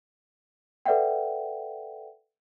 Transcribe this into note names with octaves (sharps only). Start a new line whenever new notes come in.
A4 B4 D5 E5 F#5 G5